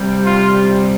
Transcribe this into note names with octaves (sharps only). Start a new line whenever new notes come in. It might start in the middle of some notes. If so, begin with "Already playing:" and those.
Already playing: C3 G3
F4